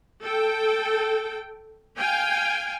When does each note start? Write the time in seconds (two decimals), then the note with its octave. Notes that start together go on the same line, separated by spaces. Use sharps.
0.23 A4 G5
1.98 F5 G5 G#5